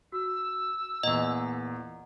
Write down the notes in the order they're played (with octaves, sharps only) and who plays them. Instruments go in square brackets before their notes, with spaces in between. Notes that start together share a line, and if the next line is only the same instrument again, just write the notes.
[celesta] F#4 [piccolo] E6
[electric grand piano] E2 A#2 [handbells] D#5 [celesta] F#5 A#5